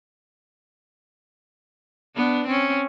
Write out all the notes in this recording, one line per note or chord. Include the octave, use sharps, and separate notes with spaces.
B3 D4
C4 C#4